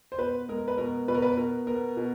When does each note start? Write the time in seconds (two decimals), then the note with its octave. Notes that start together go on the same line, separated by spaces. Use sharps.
0.12 C5
0.18 B2 B4
0.49 G#3 A#4
0.68 B4
0.78 B2 A#4
1.08 B2 B4
1.14 A#4
1.22 B4
1.37 B2 A#4
1.67 B3 A#4
1.97 B2